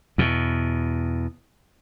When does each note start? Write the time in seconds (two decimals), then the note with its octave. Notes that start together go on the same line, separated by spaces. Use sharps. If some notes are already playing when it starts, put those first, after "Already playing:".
0.18 E2 B2